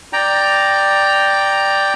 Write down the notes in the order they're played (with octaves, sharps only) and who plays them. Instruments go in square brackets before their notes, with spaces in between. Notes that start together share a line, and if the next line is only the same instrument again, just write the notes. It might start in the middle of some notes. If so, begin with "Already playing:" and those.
[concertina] D5 G5 A#5